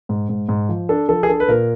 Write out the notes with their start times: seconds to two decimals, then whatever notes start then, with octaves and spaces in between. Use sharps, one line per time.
0.09 G#2
0.29 G#2
0.49 G#2
0.69 F3
0.89 D4 A4
1.09 F3 A4
1.23 G#4
1.28 D4 A4
1.40 B4
1.48 A#2 A#4